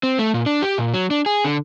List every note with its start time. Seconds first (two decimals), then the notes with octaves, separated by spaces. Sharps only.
0.03 C4
0.19 A3
0.34 A#2
0.46 D4
0.62 G4
0.78 A#2
0.94 F#3
1.11 D4
1.26 G#4
1.45 D3